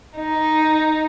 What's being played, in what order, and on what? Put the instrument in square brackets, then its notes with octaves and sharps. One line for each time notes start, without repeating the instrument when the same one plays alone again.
[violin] D#4